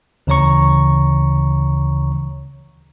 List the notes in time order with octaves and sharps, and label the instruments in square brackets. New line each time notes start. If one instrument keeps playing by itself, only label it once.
[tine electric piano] D2 C#3 E3 C#5 A#5 C#6